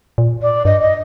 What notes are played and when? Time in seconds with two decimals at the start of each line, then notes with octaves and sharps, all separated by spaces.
0.18 A#2
0.42 D5
0.65 G2 D#5
0.81 D#5